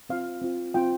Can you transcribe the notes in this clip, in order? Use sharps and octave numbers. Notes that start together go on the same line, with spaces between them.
C4 F4 F5
C4 F4
C4 F4 G5